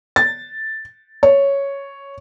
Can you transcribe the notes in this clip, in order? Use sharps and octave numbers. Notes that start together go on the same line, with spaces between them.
A6
C#5